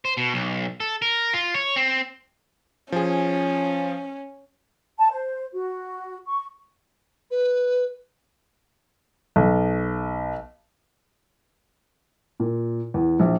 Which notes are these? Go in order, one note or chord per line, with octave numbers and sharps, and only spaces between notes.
C5
B2
B1
A4
A#4
F4
C#5
C4
F3 C#4 G#4
A5
C5
F#4
C#6
B4
B1
A#2
E2
A#1